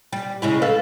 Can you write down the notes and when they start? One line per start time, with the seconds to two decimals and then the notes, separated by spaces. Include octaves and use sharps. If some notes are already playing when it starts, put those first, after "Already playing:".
0.13 G3
0.42 C#3 G#3 E4
0.62 A4 B4 F5